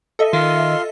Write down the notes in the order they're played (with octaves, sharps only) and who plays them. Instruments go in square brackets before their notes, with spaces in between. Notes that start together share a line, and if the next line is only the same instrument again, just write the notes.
[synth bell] A4 D#5 E5
[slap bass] D#3 [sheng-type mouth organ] F4 C6